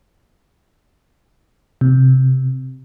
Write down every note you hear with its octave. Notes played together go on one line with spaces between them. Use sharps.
C3